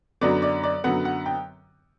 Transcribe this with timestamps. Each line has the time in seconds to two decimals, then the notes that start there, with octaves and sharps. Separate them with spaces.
0.21 F#2 D3 F#3 B3 D5
0.42 D5
0.64 D5
0.84 F#2 D3 F#3 B3 F#5
1.05 F#5
1.26 G5